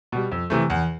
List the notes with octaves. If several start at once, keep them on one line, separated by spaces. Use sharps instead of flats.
B2 G3
F2
C3 E3 A3
E2